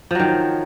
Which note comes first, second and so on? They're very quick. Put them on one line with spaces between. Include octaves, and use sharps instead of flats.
F3 F#3 D#3